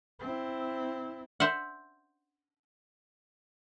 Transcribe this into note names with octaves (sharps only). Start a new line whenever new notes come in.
C4 E4
C5 E5 F#5